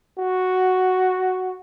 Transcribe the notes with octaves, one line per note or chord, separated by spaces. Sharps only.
F#4